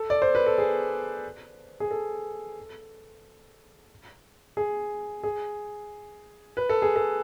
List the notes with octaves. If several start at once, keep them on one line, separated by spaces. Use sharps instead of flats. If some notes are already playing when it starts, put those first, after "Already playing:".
Already playing: A4
D5
C5
B4
A4
G#4
G#4
A4
G#4
G#4
B4
A4
G#4
A4